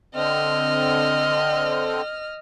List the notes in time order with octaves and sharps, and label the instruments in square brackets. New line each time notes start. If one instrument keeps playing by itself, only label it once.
[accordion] D3 C4 [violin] D#5 F6